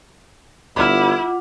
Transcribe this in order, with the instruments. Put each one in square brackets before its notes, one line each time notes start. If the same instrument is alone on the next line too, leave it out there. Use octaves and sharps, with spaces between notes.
[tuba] G1 [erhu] E4 [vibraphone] F4 F#5 D6 [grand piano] B5 F6